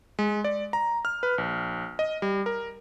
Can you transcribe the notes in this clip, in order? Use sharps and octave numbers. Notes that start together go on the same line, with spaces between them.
G#3
D5
A#5
F6
B4
A#1
D#5
G3
A#4